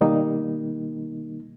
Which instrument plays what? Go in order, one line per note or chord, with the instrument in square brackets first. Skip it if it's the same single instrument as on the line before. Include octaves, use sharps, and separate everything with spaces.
[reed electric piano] B2 D#3 G3 A#3 D#4